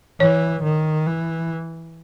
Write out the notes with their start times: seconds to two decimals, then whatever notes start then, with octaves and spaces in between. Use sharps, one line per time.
0.20 E3 C#5
0.63 D#3
1.07 E3